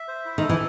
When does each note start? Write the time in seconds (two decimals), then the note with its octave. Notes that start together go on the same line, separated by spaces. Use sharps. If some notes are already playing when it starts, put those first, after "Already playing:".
Already playing: E5
0.08 C5
0.25 E4
0.38 D#3
0.43 A4
0.49 E3